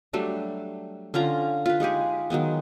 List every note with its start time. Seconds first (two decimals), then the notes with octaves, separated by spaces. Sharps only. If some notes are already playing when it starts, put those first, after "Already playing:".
0.13 F#3 G3 A3 D4
1.14 D3 C#4 F4 A#5
1.66 F4 B4
1.80 G#3 D#4 G4 G#4
2.30 D#3 F#3 G#3 B3